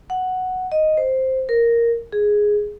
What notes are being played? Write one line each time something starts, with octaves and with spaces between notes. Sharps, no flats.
F#5
D#5
C5
A#4
G#4